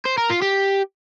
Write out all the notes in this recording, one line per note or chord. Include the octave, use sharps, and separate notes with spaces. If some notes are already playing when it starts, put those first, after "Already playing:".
C5
A#4
F4
G4